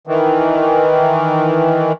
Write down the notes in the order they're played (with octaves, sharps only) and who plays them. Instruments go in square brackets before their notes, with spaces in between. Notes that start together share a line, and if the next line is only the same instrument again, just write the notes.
[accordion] D#3 E3